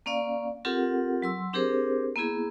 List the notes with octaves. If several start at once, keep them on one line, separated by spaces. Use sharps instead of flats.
A#3 C#4 D5 F5
C4 F4 G4 A4 A#4 F#5
F#3 C6 E6
C4 D4 G4 G#4 A#4 C5
A#3 B3 E4 G#4